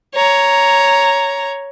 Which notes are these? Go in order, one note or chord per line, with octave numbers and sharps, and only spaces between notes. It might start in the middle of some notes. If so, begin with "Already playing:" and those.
C#5 A#5